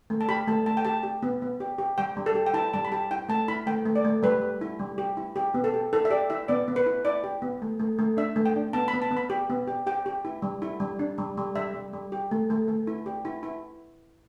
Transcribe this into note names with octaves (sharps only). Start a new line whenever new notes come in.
A3
A5
G4 B5
A3 A5
A3 A5
G5
G4 A5
G4
B3
B3
G4
G4
G3 G5
G3
A4
G4
G5
E4 A5
G3 A5
B5
G4 A5
E4 G5
A3 A5
E4 B5
A3 G5
A3
D5
A3
G3 B4
G3
E4
G3
G4
E4
G4
B3
A4
G4
E4 A4
E5
G4 D5
E4 E5
B3 D5
B3
B4
E4
E4 D5
G4
B3
A3
A3
A3
D4 E5
A3
G5
D4
B3 A5
B5
B3
A5
B3
B5
G4
B3
G4
G4 G5
G4
E4
G3
E4
G3
D4
G3
G3
G3 E5
G3
G3
G4
A3
A3
A3
E4
G4
E4
E4